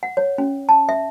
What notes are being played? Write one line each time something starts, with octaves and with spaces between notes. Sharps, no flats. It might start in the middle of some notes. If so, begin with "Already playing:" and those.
F#5
C#5
C#4
A5
E5